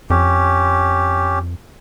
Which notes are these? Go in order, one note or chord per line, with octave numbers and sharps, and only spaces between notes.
F2 C#4 G4